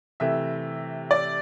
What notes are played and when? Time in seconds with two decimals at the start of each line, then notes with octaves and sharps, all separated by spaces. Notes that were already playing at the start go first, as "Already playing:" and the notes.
0.20 C3 E3 A3 E5
1.11 D5